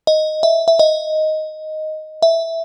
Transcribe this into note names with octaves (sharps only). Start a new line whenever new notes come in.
D#5
E5
E5
D#5
E5